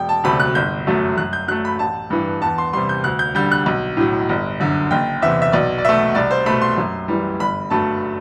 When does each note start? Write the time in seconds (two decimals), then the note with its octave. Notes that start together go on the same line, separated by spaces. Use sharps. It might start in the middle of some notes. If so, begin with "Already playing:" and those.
Already playing: E1 G5
0.09 A5
0.24 D2 C3 F#3 A3 B5
0.40 F#6
0.55 G1 G6
0.87 F#2 F#3 A3
1.17 F#2 F#6
1.33 G6
1.48 F#3 A3 F#6
1.65 B5
1.79 A1 A5
2.10 G2 E3
2.42 E2 A5
2.58 C6
2.73 C3 G3 C6
2.89 G6
3.04 D2 F#6
3.19 G6
3.35 D3 G3 G6
3.51 F#6
3.66 B1
3.97 A2 F#3
4.29 G1
4.60 F#2 D3
4.91 F#1 G5
5.22 E2 C3 E5
5.42 E5
5.52 B1 D5
5.78 D5
5.84 B2 A3 E5
6.15 C2 D5
6.31 C5
6.46 B2 A3 B5
6.62 C6
6.78 F#2
7.08 E3 G3
7.40 G1 B5
7.70 G2 F#3 A3 A5